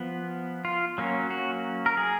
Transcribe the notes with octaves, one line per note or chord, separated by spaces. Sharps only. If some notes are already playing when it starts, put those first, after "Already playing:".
Already playing: F3 B3
F4
F#3 A#3 C#4
F#4
A#4
G#4